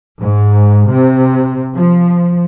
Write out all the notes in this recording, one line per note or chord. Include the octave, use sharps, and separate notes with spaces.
G#2
C3
F3